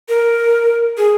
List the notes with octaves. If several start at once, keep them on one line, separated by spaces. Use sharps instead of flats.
A#4
G#4